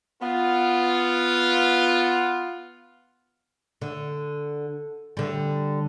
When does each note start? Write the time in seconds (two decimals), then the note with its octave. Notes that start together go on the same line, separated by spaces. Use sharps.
0.22 B3 F4
3.81 D3
5.17 D3 G3